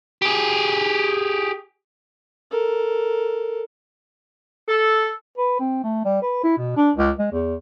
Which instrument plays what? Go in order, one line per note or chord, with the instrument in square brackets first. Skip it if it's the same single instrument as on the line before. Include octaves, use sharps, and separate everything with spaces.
[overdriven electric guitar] G4 G#4
[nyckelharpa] A4 A#4
[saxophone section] A4
[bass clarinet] B4
C4
A3
G3
B4
E4
B2
D4
C#2
G#3
E2